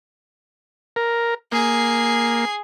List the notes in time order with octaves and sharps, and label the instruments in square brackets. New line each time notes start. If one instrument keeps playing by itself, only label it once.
[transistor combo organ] A#4
[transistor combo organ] A#3 [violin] G#4 C7